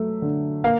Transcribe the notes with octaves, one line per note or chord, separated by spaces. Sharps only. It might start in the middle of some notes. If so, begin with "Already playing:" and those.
Already playing: F#3 A3
D3
A#3 F5